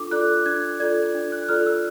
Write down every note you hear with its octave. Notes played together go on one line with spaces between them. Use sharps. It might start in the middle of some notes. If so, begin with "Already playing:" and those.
Already playing: D4 F4 A4 D6
F4 A4 D5 F#6
D4 G#6
F4 A4 D5 G#6
D4
F#6
F4 A4 D5 F6
E6